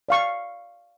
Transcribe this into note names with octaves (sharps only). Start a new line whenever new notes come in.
D5 F5 C#6